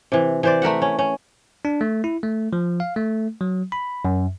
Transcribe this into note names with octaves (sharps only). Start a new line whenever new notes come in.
C3 E3
E3 C5 D5
A3 A#4 E5 F#5
C#4
C#4
D4
A3
E4
A3
F3
F5
A3
F#3
B5
F#2